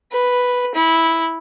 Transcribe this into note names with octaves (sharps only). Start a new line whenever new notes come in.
B4
E4